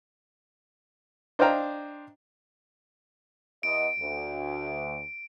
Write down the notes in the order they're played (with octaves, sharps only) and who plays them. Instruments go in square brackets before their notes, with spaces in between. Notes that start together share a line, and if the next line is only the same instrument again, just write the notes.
[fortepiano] D4 C5 D#5 F5 G5 A#5
[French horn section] E2 B3 D#5 [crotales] D7
[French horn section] D2